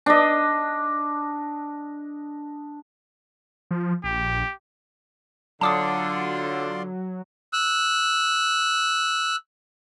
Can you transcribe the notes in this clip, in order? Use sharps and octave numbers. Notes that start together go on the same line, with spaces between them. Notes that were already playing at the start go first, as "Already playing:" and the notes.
D4 D#5
F3
A#1 G4
D3 F#3 F4 D5 A5 C6 D6 D#6
E6 F#6